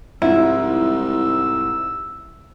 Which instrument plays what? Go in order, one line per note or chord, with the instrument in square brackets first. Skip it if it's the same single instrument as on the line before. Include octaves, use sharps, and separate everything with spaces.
[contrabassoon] C2 [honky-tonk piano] G#2 F3 [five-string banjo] E4 [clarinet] E6